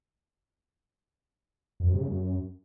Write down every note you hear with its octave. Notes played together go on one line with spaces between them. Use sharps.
F2
F#2
C3
C#3
F#2